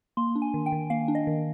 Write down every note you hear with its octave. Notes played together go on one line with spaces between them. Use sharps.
A#3 C6
D4
G#5
D#3
G5
D#3
A#3 F5
D4
D#5
D#3